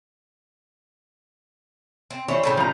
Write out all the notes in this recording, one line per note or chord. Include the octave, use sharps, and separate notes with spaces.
C4
E3 C5 C#5
A2 C#3 G3
F3 A#5